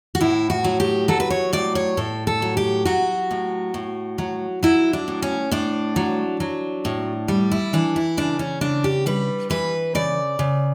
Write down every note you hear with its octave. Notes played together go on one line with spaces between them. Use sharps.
F#4
A2 E4
F#4
F#3
G4
F#3 A4
B4
C#5
A2 D5
C#5
A2 A4
A4
F#3
G4
F#3 F#4
A2
A2
F#3
F#3 E4
D4
A2
C#4
A2 D4
F#3
F#3
A2
G3
E4
E3 D4
E4
C#3 D4
C#4
C#3 D4
G4
G3 B4
E3 B4
C#3 D5
C#3